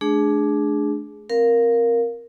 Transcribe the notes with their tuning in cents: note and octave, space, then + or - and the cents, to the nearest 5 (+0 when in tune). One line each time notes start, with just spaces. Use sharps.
A3 -35 D4 +0 G#4 +0
C4 +5 A#4 +0 F5 +5